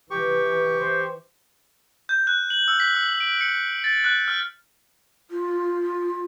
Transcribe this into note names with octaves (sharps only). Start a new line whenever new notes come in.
E3 G4 C#6
C5
G6
F#6
F#7
E6
B6
E6
D7
C#7
A6
F#6
F6
F4